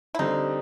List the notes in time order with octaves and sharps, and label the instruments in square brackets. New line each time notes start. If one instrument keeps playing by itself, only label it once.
[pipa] E4
[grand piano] D3 G3 C4 [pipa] D#4